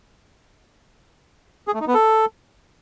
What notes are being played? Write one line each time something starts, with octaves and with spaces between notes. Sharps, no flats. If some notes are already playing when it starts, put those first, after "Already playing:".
G#4
A3
D#4
B3
A4